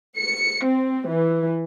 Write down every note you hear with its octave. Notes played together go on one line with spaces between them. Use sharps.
C#7
C4
E3